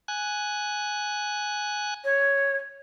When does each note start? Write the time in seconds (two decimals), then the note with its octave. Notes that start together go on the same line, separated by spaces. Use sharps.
0.08 G#5 F#6
2.04 C#5